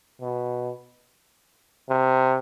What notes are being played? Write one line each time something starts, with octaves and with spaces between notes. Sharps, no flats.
B2
C3